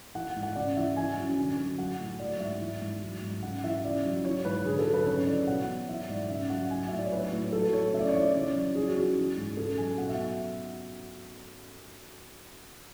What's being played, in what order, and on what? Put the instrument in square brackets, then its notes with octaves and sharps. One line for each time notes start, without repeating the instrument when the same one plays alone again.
[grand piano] E3 F#5
G#2
F#5
C#3 D5
E3 E5
E3 G#5
F#2
D3
F#3
F#3 F#5
A2
F#3 D5
G#2 E5
E3
G#2
F#3
G#2
C#3 F#5
E3 E5
C#3 D5
F#3
E3 C#5
G#2 B4
D3 G#4
A4
F#3
B4
C#3 C#5
E3 D5
B2 F#5
F#3
E3 E5
G#2 D5
C#3 E5
F#3 F#5
F#3 G#5
A2 E5
D5
C#5
F#3 B4
A2
F#3 A4
A2 C#5
C#3 E5
D5
C#5
E3 D5
C#3 D5
F#3
E3 G#4
F#4
F#2 G#4
E3
G#2
C#3 A4
F#3 G#5
B2 F#5
E5